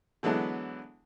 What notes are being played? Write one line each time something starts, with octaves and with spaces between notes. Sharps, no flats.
D3 E3 F#3 G#3 B3 D4